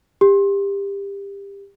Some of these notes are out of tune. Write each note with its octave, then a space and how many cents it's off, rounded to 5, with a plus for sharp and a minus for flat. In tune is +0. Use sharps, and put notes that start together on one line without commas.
G4 +25